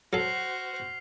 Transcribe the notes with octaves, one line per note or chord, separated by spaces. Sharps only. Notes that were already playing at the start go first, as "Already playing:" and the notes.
F#3 F#4 A4 C5 F6 C7 F7